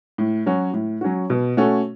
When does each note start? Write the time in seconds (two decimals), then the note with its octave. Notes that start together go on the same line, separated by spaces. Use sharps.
0.18 A2
0.46 F#3 C#4 F#4
0.73 A2
1.01 F#3 C#4 F#4
1.30 B2
1.57 A3 C#4 F#4 A4